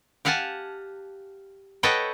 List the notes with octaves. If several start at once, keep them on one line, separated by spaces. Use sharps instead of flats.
G4 F5 F#5 G#5 A5
A4 B4 C#5 D#5 F#5 G5